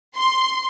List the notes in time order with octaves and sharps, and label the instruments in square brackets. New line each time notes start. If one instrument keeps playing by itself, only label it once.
[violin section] C6